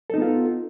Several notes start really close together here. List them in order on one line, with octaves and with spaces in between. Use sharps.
A4 D#4 B3 F4